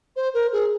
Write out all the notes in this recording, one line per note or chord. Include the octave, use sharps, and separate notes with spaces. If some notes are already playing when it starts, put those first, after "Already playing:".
C5
A#4
G#4